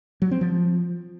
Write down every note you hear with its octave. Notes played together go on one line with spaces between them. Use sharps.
F#3
C4
F3